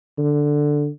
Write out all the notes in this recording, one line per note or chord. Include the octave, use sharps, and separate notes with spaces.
D3